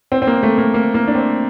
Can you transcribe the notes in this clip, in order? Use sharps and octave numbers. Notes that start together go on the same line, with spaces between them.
C4
C4
A#3
A3
A#3
A#3
A#3
D4
C4